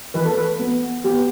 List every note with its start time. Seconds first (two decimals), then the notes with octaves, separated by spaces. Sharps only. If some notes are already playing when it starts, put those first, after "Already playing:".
0.14 E3 B4
0.25 A4
0.35 B4
0.60 B3
1.04 B3 G4